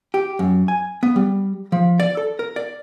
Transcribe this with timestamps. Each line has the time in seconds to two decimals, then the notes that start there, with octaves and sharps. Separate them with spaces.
0.14 G4
0.39 F#2
0.68 G#5
1.03 B3
1.16 G3
1.72 F3
2.00 D5
2.17 A4
2.39 A#4
2.56 D5